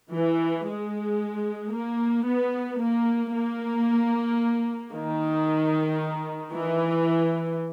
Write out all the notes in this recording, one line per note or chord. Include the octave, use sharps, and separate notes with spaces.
E3
G#3
A#3
B3
A#3
A#3
D#3
E3